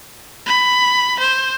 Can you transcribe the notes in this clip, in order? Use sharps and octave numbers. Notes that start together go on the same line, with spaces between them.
B5
C5